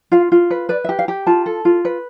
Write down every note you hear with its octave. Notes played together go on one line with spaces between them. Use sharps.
F4 F5
F4
B4
B4 D5
E5
G4
F5
G4
F4 A5
A4
F4
B4